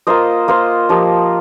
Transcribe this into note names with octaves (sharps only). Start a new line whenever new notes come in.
A#3 F4 C5 D#5
A#3 F4 C5 D#5
F3 A#3 G4 D#5